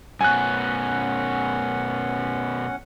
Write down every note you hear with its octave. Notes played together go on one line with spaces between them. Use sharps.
F#2 B2 C#4 F#5 G#5 F#6